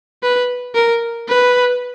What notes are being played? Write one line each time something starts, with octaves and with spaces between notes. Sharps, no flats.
B4
A#4
B4